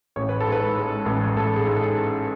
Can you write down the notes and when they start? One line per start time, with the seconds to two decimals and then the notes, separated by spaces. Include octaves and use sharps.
0.16 A1 C#5
0.29 B4
0.40 A4
0.47 G#2
0.52 B4
0.76 G#3
1.06 A1
1.36 A1 A4
1.56 G#4
1.66 G#2
1.76 A4